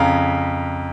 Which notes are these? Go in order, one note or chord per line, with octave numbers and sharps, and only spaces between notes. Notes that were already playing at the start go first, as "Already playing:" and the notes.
Already playing: F2 C#3 F5 A#5